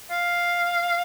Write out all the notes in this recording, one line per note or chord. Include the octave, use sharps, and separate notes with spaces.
F5